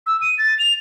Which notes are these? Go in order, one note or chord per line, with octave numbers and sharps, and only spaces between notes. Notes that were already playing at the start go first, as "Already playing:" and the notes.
E6
D#7
A6
F7